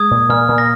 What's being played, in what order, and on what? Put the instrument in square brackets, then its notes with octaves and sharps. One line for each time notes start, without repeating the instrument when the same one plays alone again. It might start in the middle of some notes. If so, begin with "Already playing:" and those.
Already playing: [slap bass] G#3 [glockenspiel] D#6 G#6
[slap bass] A#2
[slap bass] A#2 [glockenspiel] F6
[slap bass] A#2
[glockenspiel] A#6